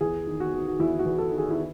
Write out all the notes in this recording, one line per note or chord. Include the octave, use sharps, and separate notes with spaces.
E2 G#4
D#3
F#4
D#3
F#4
E2 E4
F#4
E2
A4
D#3
G#4
E4